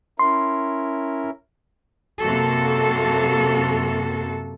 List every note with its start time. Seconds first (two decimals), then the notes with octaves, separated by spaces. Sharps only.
0.19 C#4 E4 A#4 C6
2.21 F#2 C3 A#3 F#4 A4